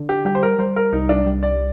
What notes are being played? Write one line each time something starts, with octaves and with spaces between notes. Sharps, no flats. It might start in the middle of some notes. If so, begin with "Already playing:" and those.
Already playing: D3
G4
G3 G4
C5
A#4
G3 C5
A#4
C2 D#4
D4
G3
D5